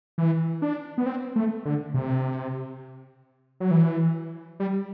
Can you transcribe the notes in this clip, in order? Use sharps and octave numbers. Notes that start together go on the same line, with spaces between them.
E3
D4
B3
C4
A3
D3
C3
F#3
E3
G3